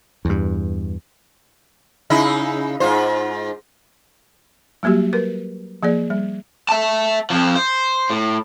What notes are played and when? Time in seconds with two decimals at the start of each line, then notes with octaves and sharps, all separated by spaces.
0.25 E2 G2
2.10 C#3 D#4 E4
2.80 G#2 F4 C5
4.83 F#3 G3 A#3 F#4 G4
5.13 A#4 B4
5.83 F3 A#3 G#4 D5
6.10 G3
6.69 E5 A5
7.30 F2 F3
7.55 C5
8.10 A2